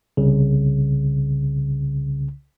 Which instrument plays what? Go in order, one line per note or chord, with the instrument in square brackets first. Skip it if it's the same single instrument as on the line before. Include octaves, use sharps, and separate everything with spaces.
[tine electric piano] C2 C#3